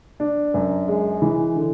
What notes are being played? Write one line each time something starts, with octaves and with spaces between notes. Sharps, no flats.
D4
F#2
G#3
E3
D3